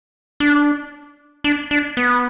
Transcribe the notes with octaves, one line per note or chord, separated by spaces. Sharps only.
D4
D4
D4
B3